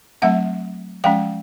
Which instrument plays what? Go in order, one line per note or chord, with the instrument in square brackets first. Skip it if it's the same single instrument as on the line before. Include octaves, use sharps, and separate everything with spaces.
[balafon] F#3 A3 C4 E5 F#5
F3 G#3 C#4 F5 G5